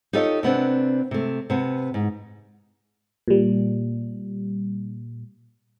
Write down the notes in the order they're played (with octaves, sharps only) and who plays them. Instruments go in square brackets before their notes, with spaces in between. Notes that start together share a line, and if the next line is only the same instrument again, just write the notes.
[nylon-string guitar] D#4 F4 G4 A4 C#5 D#5
C3 B3 C4 D4
C3 A3
C3 B3 G#5
G#2
[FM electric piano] A#2 G3